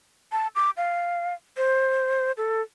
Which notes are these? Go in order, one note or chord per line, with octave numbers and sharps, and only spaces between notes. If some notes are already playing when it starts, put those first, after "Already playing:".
A5
D6
F5
C5
A4